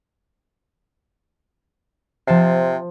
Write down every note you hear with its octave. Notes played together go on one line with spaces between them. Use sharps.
C3 F3 A5 C7